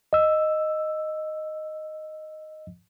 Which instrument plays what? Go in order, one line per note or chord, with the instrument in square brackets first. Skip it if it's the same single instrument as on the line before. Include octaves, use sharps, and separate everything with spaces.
[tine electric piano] D#5 E6